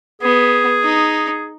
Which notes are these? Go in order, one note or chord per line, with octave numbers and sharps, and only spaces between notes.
B3 G#4
D#4